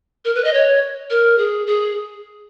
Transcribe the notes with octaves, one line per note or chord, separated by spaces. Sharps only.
A#4
B4
D#5
C#5
A#4
G#4
G#4